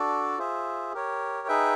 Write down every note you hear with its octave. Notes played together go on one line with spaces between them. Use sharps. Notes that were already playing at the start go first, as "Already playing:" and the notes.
Already playing: D4 F#4 A4 D5
F4 G#4 C5 E5
G4 A#4 C#5
D#4 G#4 B4 E5 G5